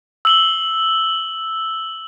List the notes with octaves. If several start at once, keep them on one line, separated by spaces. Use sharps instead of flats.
E6 F#7 G7